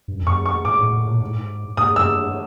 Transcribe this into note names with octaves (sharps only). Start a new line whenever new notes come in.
G2
F#2
F2
F#2 C#6
C#6
G#2 D6
A2
A2
A#2
G#2
A2
G#2
G#2 D#6
G2
F#2 E6
G2